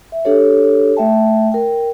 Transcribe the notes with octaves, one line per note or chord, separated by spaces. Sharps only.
E5
D4 G4 A4 C#5
A3 E5 G5 A5
A#4 G5